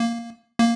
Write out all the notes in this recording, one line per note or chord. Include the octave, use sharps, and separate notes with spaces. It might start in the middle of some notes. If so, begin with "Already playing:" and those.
Already playing: A#3
A#3